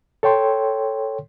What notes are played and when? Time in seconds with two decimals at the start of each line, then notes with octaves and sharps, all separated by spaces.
0.23 A4 C#5 G5 C6